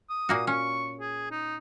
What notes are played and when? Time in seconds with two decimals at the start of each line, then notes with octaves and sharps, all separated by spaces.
0.10 D#6
0.29 A#2 A#3 F#4
0.47 C#4 C#6
1.00 G#4
1.31 D#4